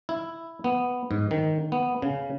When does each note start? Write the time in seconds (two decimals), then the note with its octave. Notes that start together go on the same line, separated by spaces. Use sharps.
0.09 E4
0.64 B3
1.11 G#2
1.31 D#3
1.72 B3
2.02 C#3